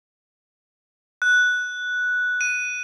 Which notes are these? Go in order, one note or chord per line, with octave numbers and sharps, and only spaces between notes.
F#6
D#7